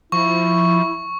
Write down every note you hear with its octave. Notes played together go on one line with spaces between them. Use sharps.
F3 E4 C#6